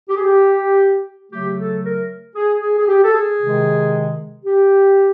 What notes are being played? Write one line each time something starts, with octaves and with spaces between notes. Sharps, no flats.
G4
G#4
G4
C#3 F#3 A3 G4
A4
A#4
G#4
G#4
G#4
G4
A4
G#4
C3 D#3 G#3
G4